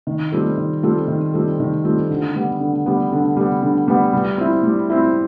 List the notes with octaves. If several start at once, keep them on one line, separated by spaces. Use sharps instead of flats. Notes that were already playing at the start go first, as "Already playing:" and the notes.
D#3
G3 C4 F4 A4
D#3
G3 C4 F4 A4
D#3
G3 C4 F4 A4
D#3
G3 C4 F4 A4
D3
G3 B3
D3
G3 B3
D3
G3 B3
D3
G3 B3
G3
C4 E4
G3
C4 E4